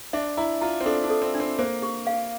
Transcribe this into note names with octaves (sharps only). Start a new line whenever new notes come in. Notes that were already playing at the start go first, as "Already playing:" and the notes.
D4 E5
E4 A#5
F4 A#5
C4
D4 A4
D4
A4
C4
D4
C4
A#3 C5
G4
F5